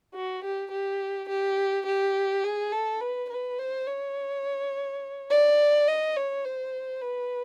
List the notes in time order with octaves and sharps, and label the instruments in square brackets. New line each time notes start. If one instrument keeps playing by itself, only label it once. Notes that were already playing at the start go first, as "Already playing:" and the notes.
[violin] F#4
G4
G4
G4
G4
G#4
A4
B4
B4
C5
C#5
D5
D#5
C#5
C5
B4